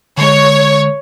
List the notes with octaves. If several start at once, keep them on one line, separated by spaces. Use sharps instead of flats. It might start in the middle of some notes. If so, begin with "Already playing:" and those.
D3 G#3 C#5